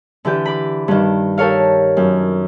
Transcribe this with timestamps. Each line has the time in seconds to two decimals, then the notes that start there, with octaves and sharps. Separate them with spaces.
0.25 D3 E3 G4 G6
0.46 B5 D6
0.88 G2 D#3
1.38 G4 A4 A#4 C#5 F5
1.97 F#2